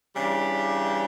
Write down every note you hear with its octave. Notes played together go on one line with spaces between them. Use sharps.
C#3 E3 G3 D4 G4